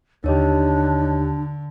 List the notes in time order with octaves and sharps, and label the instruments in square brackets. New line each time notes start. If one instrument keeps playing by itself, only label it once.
[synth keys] D#2 G4 [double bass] D3 [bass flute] D4 [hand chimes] D#4 C#5 D#5